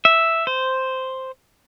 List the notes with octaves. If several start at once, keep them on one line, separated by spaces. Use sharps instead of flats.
E5
C5